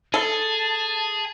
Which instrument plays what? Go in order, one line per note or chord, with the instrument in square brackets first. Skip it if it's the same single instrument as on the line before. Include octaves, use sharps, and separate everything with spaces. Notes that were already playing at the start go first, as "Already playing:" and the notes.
[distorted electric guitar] G#4 [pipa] A4 [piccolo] A5